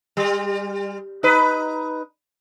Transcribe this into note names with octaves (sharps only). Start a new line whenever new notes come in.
G3
D#4 B4